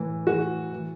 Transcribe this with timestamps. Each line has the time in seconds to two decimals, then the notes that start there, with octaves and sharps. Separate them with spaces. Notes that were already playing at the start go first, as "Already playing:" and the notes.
Already playing: A2 E3
0.27 A2 E3 F#4
0.72 E3